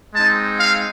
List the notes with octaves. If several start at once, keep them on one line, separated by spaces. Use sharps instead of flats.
G#3 C4 D#4 A5
F5